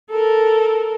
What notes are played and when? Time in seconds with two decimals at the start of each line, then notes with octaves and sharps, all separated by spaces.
0.10 A4 A#4